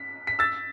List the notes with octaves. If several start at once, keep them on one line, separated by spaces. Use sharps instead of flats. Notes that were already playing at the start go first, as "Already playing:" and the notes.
Already playing: B6
B6
E6 A6